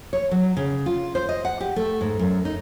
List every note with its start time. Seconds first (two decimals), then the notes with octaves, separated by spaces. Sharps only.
0.13 C#5
0.31 F#3
0.57 C#3
0.86 F4
1.15 C5
1.29 D#5
1.45 F#5
1.61 G4
1.76 A3
2.01 G#2
2.19 F#2
2.45 D#4